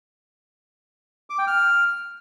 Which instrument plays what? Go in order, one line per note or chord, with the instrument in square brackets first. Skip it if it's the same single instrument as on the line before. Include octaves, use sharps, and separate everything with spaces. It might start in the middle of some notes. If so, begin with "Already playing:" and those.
[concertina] D6
G5
F6